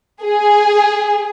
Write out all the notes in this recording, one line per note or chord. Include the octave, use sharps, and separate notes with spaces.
G#4